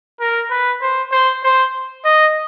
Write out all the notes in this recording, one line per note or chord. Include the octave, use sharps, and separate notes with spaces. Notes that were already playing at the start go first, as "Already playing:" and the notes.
A#4
B4
C5
C5
C5
D#5